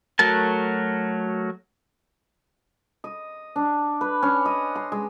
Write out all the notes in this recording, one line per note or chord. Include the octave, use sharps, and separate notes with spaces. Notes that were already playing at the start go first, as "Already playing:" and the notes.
F#3 A3 F#4 A#4 A5
D#5
D4
B4
C#4
D#5
C6
G#3